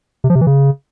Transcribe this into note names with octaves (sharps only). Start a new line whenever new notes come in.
C3
F3
C3
E3
C#3